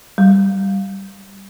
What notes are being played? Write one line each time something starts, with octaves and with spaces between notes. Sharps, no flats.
G3